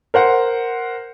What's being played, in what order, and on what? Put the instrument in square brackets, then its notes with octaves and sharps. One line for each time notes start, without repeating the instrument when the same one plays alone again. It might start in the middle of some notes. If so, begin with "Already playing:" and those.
[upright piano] A#4 C5 F#5